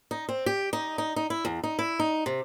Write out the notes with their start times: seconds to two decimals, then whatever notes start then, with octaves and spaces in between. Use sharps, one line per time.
0.11 D#4
0.29 C4
0.46 G4
0.73 D#4
0.98 D#4
1.16 D#4
1.30 E4
1.45 E2
1.63 D#4
1.79 E4
1.99 D#4
2.26 C3